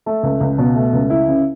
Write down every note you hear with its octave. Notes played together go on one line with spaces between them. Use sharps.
A3
C#2
C#2
B2
A3
C#2
E4
C#3